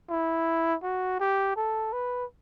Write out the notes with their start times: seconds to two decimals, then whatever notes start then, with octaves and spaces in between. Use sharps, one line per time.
0.09 E4
0.83 F#4
1.20 G4
1.56 A4
1.93 B4